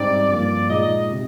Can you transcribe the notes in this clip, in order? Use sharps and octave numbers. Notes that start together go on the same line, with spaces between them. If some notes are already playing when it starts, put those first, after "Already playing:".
Already playing: G#2 G3 C4 D#4 D5
G2 F3 A#3 D5
A#2 G#3 D#4 D#5
C3